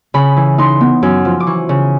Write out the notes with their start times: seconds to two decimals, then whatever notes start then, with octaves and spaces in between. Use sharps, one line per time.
0.14 C#3 B5
0.37 E3
0.58 D#4 C6
0.81 B3
1.03 F#2
1.25 F3
1.40 D6
1.47 E3 C#6
1.69 C#3